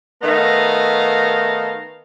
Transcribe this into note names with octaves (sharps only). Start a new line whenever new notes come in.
D#3 A3 B3 D#5 F5 A#5